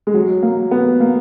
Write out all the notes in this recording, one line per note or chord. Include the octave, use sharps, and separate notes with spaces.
G#3
F#3
A#3
B3
A#3